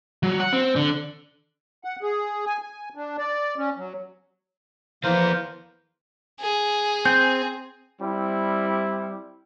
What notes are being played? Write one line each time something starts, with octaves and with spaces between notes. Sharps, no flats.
F#3
F#5
C4
D3
F#5
G#4
G#5
G#5
D4
D5
C#4
F#3
E3 F3 A#3 B3 A#4 C5
G#4
C4 G6
G3 C4 E4